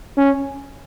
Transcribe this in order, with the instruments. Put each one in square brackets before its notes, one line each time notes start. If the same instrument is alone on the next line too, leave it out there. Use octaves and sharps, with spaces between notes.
[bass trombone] C#4